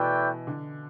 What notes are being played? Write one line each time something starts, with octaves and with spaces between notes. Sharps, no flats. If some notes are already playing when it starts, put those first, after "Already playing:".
Already playing: B2 E3 A3 E4 B4 D5 G5
D3